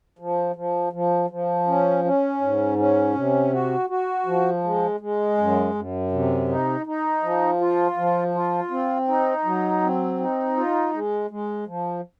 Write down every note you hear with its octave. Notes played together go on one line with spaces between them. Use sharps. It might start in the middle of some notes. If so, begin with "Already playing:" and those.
F3
F3
F3
F3
C#4
C#4
G#2
C#4
C3
F#4
F#4
F3
G#3
G#3
F#2
F#2
C3
D#4
D#4
F3
F4
F3
F4
C4
D#4
F#3
C4
D#4
F4
G#3
G#3
F3